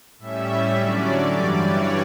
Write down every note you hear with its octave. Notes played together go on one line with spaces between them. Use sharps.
A2 G3 C#4 E5
D3 F#3 C#4 D5
G2 E3 G3
C#5